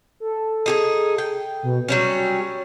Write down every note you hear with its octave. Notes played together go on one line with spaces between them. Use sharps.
A4
D#4 G4 G#4
G5
B2
F#3 G3 C#4 C#5